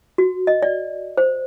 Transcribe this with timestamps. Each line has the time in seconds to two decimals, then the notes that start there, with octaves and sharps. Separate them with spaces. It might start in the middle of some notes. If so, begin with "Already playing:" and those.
0.18 F#4
0.47 D#5
0.63 D5
1.18 C5